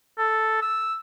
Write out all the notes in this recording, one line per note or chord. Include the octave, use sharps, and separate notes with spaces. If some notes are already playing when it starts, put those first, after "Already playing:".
A4
E6